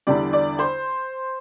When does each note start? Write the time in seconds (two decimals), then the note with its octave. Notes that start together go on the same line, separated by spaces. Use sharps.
0.07 E2 D3 G3 D5
0.33 D5
0.59 C5